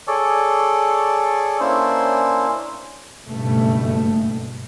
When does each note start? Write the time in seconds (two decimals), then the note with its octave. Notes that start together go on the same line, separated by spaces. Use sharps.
0.07 G#4 A4 C#5 D5
1.60 A#3 C#4 D4 E4 C5
3.26 F#1 G2 B2 A3